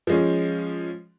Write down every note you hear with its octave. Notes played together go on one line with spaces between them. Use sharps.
F3 G#3 C#4